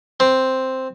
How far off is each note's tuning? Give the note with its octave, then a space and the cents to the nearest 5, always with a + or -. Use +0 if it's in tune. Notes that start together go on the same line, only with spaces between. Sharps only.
C4 +0